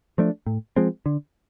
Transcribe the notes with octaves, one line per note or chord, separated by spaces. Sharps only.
F3 A3 D4
A2
F3 G#3 C4
D3